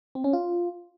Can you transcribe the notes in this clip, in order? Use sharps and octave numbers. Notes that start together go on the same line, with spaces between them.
C4
C#4
F4